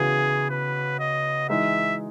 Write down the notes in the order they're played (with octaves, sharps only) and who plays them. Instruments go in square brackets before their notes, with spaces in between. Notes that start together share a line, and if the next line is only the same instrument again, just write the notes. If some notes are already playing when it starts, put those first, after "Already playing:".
Already playing: [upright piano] C#3 E3 B3 F#4 [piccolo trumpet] G#4
[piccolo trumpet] B4
D#5
[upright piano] E3 G#3 D#4 [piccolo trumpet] E5